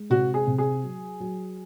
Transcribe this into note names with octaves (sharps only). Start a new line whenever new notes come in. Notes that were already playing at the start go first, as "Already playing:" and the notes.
Already playing: G#3
C3 F#4
G#4
C3
G#4
F#3
F#3